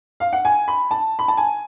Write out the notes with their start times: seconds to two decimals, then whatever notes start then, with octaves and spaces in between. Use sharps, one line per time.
0.20 F5
0.33 F#5
0.45 G#5
0.68 B5
0.91 A5
1.19 B5
1.28 A5
1.37 G#5